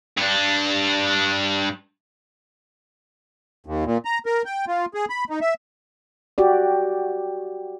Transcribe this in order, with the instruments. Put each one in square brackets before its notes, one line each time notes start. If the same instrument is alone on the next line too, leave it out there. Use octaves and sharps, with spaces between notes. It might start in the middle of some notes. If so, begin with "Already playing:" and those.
[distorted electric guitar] G2 D4
[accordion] D#2
A#2
A#5
A#4
G5
F4
G#4
B5
D#4
E5
[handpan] F#4 G4 D5